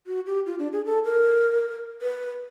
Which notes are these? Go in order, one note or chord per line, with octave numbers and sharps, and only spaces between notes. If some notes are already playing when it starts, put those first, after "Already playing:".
F#4
G4
F4
D4
G#4
A4
A#4
B4